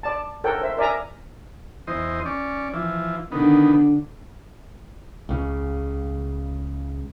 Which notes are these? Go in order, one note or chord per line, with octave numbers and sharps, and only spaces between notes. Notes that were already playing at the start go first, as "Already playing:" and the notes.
D5 A5
A4 A#4 C#5 F#5 G5
C5 E5
A#4 D5 E5 G#5 A#5
E2 C5 D#5
C#4 D5
E3 F3
D3 D#3 B3
C#2 C#3